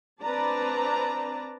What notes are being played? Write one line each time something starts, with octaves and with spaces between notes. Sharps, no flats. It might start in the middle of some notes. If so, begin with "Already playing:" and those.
C4 D4 B4 D5 A5 A#5